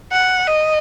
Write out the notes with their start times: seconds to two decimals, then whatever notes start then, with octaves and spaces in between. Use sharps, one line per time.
0.12 F#5
0.47 D#5